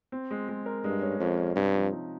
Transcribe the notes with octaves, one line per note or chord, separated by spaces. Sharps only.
C4
G#3
G#3
A#4
G2 G#3
C#4
F2 C#4
C#4
G2 C3
F3
D#4